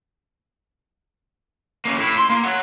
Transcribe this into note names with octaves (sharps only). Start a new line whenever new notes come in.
A#3 C#4
A2 E4
C6
A#3
C#5 F#5